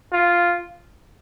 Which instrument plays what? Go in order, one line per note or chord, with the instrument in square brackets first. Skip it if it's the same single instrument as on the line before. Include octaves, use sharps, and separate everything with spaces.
[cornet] F4